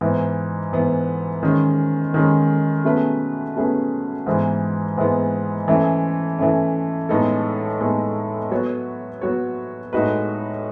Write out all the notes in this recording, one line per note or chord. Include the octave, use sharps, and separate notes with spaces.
G#2 E3 B3
G#2 E3 B3
D#3 G#3 C#4
D#3 G#3 C#4
B2 A3 C#4 G#4 B4
B2 A3 C#4 G#4 B4
G#2 E3 G#3 B3
G#2 E3 G#3 B3
E3 A3 C#4
E3 A3 C#4
A2 G#3 B3 D#4 A4
A2 G#3 B3 D#4 A4
F#3 B3 F#4 C#5
F#3 B3 F#4 C#5
A2 G#3 D#4 F#4 B4